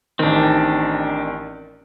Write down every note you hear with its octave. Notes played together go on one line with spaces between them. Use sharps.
A1 D#3 C4 D4